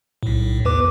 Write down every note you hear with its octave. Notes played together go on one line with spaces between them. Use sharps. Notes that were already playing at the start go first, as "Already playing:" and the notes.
B1 A2
E2 B4 D6